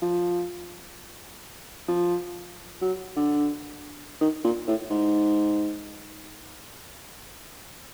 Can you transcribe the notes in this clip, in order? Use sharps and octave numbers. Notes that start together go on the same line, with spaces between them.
F3
F3
F#3
D3
D#3
A#2
A2
G#2